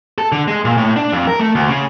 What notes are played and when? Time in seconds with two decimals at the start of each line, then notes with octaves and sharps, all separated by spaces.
0.18 A4
0.32 D3
0.48 G#3
0.65 A#2
0.77 A2
0.96 D4
1.12 F2
1.27 A#4
1.40 A3
1.55 D2
1.70 C#3